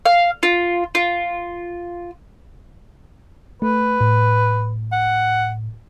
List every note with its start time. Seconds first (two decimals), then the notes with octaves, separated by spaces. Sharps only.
0.06 F5
0.43 F4
0.95 F4
3.62 A3 B4
4.01 A2
4.92 F#5